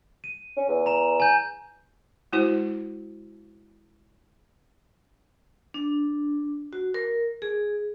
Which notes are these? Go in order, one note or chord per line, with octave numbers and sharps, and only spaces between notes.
D#7
C#4
E2
A#5 E7
G#5 G6
G#3 E4 F#4 C5
D4
F#4
A#4
G#4